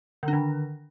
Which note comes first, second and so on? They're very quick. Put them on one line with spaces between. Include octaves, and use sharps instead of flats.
D3 D4 D#3